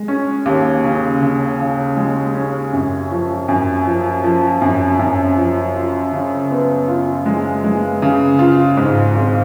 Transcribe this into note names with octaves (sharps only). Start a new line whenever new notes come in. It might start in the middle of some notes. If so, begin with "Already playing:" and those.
Already playing: G#3
C#4
D#2
C#3
C#3
C#3
G#3
C#4
F#2
F3
F#2
F3
F3
F#2
F#2
F3
F4
C#3
B3
F4
G#3
G#3
C#3
F4
G#2
G#1